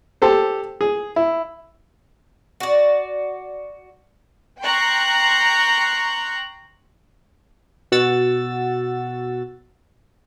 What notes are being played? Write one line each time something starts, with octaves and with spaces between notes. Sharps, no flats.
G4 A4 C5
G#4
E4
F#4 D5
G5 A#5 C6 C#6 F#6
B2 F#4 F#5 E6 A6